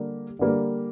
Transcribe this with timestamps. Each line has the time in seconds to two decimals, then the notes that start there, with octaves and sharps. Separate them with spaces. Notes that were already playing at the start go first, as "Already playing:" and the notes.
Already playing: D3 G3 A#3 G4
0.39 D3 G3 A#3